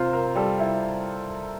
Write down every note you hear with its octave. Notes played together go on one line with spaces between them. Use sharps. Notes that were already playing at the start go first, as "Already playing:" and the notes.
Already playing: C3 F4 A#4 C5
A#4
G3 A4
E4